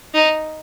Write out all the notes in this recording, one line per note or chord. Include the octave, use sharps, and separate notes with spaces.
D#4